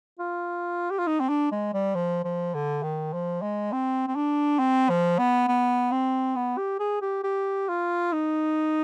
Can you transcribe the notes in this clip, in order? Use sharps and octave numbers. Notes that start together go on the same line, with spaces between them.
F4
G4
F4
D#4
C4
D4
G#3
G3
F3
F3
D3
D#3
F3
G#3
C4
C4
D4
C4
F3
B3
B3
C4
B3
G4
G#4
G4
G4
F4
D#4